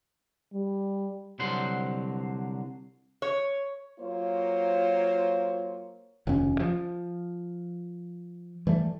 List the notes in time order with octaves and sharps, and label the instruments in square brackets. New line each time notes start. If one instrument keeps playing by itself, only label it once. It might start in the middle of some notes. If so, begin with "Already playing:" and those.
[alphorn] G3
[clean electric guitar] C2 D3 F#3 C5 F#5 C6
[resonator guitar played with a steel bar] C#5
[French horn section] F#3 A#3 F4 C5 C#5
[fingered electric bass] F1 D#2 C#3 C#4
F3
E3 G3 A3